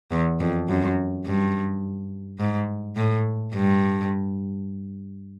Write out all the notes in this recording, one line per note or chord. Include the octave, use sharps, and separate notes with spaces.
E2
F2
F#2
G2
G#2
A2
G2